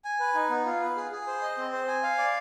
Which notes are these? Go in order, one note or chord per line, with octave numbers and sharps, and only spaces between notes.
G#5
B4
D#4
B3
F4
B4
G#4
G#4
C5
D#5
C4
C5
G#5
F5
D5